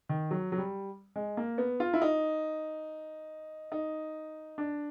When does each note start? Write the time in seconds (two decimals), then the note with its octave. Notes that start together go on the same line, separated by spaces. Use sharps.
0.09 D#3
0.31 F#3
0.52 F#3
0.58 G3
1.16 G#3
1.37 A#3
1.58 B3
1.80 F4
1.93 E4
2.01 D#4
3.72 D#4
4.58 D4